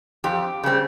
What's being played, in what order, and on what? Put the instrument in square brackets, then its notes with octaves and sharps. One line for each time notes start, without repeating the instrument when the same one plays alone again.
[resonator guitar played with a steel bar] F2 G4
C#3 G3 C4